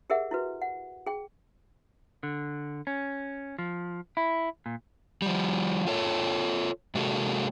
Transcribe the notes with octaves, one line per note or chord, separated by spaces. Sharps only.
G4 G#4 A#4 E5 F#5
E4 F#4 B4
F#5
G#4 G5
D3
C#4
F3
E4
A#2
F3 G3
F4 A4 C#5 A5
C3 G#3 A#3 F#4 G#4 A4